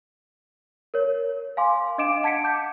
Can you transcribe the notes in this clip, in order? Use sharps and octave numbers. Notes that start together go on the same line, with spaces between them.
A#4 C#5
F5 G#5 C6 D6
D4 D#5 F5 D6 D7 E7
F#5 A5 G#6 B6 C#7 D7
D6 G6